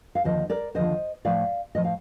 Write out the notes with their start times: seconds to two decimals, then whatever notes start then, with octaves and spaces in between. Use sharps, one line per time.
0.15 F5
0.24 D#2 D3 F3 C5 D#5
0.50 A#4 D5
0.74 D#2 D3 F3 C5 D#5
1.25 A2 F3 D5 F5
1.75 A2 F3 D#5
1.84 F5